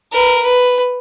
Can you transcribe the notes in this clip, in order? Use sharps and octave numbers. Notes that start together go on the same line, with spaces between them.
A#4 B4
B4